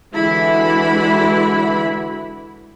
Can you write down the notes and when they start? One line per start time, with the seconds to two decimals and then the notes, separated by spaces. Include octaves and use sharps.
0.14 D3 E3 G#3 E4 F#4 B5